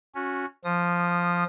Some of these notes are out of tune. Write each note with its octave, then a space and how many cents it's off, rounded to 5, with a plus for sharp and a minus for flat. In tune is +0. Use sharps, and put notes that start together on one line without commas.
C#4 +0 F#4 -20
F3 +0 D#6 -20